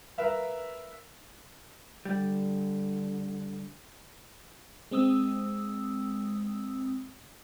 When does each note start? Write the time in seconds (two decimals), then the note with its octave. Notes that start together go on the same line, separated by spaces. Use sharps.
0.18 A#4 B4 E5 F5
2.05 D3 G3
4.91 G#3 C4 D#6 E6